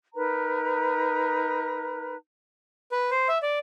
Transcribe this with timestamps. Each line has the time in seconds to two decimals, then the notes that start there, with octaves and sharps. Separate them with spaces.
0.14 D#4 A#4 B4 A#5
2.92 B4
3.11 C5
3.29 E5
3.42 D5